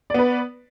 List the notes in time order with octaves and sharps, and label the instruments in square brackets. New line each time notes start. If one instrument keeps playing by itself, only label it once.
[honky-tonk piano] D5
B3
B4